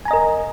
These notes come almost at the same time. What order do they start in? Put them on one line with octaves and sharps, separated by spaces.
G#5 A#5 D#5 A#4